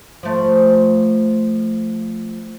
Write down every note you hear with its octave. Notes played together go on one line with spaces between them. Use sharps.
F3 A3